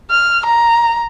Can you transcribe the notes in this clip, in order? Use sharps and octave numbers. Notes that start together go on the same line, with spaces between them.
F6
A#5